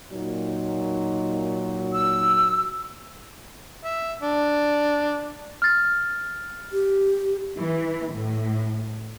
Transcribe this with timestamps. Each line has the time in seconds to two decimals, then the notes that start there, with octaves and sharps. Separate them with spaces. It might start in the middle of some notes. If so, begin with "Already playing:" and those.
0.12 A#2 F#3 D#4
1.92 E6
3.85 E5
4.23 D4
5.62 F6 A6
6.72 G4
7.58 E3
8.12 A2